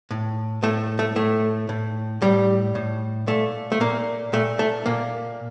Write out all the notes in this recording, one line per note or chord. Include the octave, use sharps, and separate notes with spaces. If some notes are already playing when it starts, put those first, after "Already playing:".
A2
A2 A3
A3
A2 A3
A2
A2 G3
A2
A#2 A3
A3
A#2 A#3
A#2 A3
A3
A#2 A#3